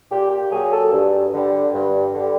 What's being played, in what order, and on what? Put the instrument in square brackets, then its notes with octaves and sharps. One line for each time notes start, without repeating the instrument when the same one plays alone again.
[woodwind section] A#2 G4
G4
F#3 A#3 G#4
A4
G2
D3 G3
G2
D3 G3